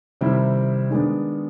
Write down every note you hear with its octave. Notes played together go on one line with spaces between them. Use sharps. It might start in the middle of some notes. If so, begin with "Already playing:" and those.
C3 D#3 G3 C4 E4
D#3 G#3 B3 D4